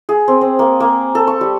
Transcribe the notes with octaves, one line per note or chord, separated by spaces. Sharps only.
G#4
C4
C4
A#3
A#3
A4
C#6
G3